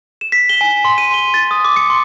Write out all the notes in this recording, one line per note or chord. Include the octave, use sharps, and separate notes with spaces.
E7
B6
G7
G#5
C6
D#7
G7
A6
D#6
D6
C#7
C6